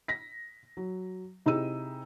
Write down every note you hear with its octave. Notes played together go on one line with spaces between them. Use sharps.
A#6 B6
F#3
C3 D#4 E4 G#4 E6 D#7